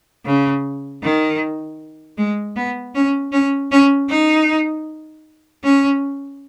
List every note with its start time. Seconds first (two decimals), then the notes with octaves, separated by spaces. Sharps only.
0.26 C#3
1.03 D#3
2.17 G#3
2.56 B3
2.95 C#4
3.32 C#4
3.71 C#4
4.09 D#4
5.63 C#4